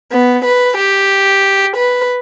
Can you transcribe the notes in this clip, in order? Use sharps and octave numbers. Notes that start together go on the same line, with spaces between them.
B3
B4
G4
B4